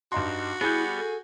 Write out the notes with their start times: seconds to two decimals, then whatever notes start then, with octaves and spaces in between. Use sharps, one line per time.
0.12 G2 D#4 F#4 C6
0.61 G3 B3 E4 G#4 G#5 G6
0.97 A4